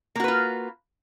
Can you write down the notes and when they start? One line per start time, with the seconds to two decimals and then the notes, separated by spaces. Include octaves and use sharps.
0.16 A#3
0.20 F#4
0.24 B4
0.28 F4